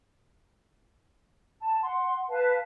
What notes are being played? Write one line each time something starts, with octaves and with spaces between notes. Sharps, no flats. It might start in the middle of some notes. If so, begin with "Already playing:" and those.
A5
F#5 C6
B4 F5 A5